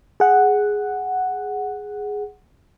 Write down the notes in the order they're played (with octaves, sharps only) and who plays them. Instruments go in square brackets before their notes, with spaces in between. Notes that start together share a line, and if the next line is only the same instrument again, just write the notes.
[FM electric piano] G#4 F#5